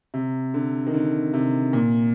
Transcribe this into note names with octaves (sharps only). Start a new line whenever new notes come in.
C3
D3
D#3
D3
C3
A#2